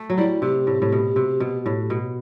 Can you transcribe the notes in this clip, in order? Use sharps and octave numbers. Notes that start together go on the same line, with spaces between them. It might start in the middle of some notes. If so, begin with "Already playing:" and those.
Already playing: A3
F#3
G3 E4
C3 G4
A2
A2
B2
C3
B2
A2
B2